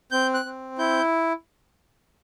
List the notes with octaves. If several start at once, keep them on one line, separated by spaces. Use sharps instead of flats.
C4 G6
F#6
C4
E4 G6